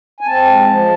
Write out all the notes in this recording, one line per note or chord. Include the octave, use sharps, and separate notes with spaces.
G#5
C4 A5
G#3
F3